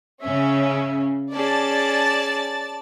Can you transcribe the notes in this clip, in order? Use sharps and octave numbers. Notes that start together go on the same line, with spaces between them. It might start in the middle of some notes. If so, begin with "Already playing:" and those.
C#3 C#4 E5
C#4 G#4 D5 A5 A6